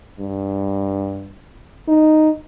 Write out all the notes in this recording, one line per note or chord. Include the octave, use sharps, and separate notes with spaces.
G2
D#4